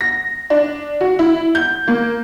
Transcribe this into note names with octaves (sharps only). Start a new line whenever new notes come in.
A#6
D4
F#4
E4
G6
A#3